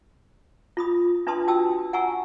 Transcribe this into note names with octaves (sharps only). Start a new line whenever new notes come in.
F4 B5 D#6
D4 F4 B4 A5 C6 D#6
F#4 G5 A5 D#6 E6
F#5 G#5 A#5 C#6 E6